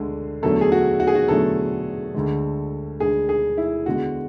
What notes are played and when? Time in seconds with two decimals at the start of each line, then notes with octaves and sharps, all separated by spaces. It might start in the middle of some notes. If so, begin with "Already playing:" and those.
Already playing: D2 D3 G#3
0.43 E2 D3 F#3 A3 A4
0.61 G#4
0.72 F#4
1.00 F#4
1.07 G#4
1.15 F#4
1.28 E2 D3 F#3 A3 A4
2.14 D2 D3 G#3
3.00 D2 D3 G#3 G#4
3.29 G#4
3.57 E4
3.86 E2 D3 G#3 F#4